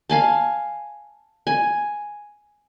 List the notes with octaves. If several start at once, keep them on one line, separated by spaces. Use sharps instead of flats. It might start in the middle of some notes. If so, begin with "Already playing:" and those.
F5 G#5 A5
G#5